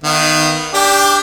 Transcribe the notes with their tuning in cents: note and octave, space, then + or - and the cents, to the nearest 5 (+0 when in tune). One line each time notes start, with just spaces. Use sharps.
D#3 -5 B3 +0 F5 -35
D4 -10 G4 +20 G5 +0